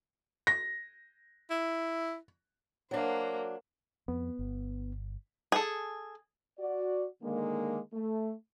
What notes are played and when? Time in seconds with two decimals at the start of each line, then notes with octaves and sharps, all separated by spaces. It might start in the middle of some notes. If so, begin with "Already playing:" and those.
0.47 A#6
1.50 E4
2.91 F#3 A#3 D4 C5
4.08 F2 B3
4.39 G1
5.52 G#4 A4
6.59 F#4 D5
7.23 D3 D#3 G#3 A#3
7.93 A3